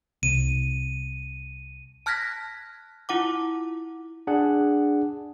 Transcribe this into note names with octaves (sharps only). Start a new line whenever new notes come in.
C2 D#7
A5 F6 F#6 G#6 A#6 B6
E4 F4 F#5 D6
D4 G#4 F#5